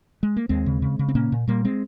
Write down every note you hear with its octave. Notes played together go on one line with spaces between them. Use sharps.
G#3
A#3
D#2 G#3 C4
C#3
C#3
C#3
C4
A#2 A#3 C#4
A#2
A#2 G3 A#3
G#3 C4